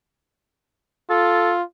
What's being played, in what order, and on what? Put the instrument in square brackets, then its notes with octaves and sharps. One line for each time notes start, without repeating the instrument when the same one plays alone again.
[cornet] F4 [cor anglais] A4